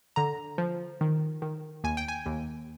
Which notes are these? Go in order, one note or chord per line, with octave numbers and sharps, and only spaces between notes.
D3 A#5
F3
D#3
D#3
D#2 G#5
G5
G#5
D#2